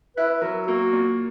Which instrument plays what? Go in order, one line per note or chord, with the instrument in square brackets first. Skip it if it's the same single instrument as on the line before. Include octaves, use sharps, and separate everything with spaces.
[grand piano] E4 [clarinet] B4
[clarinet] B4
[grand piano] F#3 [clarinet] A#4
[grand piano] A#3 [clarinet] F#4
[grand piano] A#2